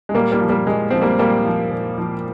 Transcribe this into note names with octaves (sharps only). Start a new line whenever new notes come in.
G#3
A#2 G3 A#3
G3 A#3
F3
G3 A#3
A#2 G#3
F3 C4
G3 A#3
A#2 G3 A#3
F3
A#2
F3